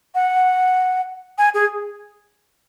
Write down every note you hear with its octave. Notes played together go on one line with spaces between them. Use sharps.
F#5
G#5
G#4